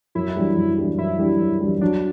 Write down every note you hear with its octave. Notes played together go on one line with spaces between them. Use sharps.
F#2 E4
E3 G3 D4 G4
F#2
E3 G3 D4 G4
F#2 E4
E3 G3 D4 G4
F#2
E3 G3 D4 G4
F#3 D4